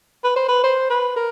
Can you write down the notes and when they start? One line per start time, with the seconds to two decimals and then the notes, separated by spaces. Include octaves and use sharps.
0.24 B4
0.36 C5
0.48 B4
0.64 C5
0.90 B4
1.16 A#4